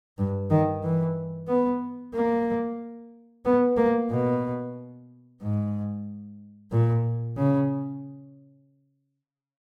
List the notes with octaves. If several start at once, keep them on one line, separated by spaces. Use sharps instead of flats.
G2
D#3
E3
B3
A#3
B3
A#3
B2
G#2
A#2
C#3